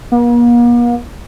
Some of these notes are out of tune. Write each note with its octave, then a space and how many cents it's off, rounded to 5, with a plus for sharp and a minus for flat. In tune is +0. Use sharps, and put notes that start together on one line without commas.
A#3 +45